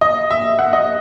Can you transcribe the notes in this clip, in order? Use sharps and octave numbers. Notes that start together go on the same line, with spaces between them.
D#5
E5
F#5
D#5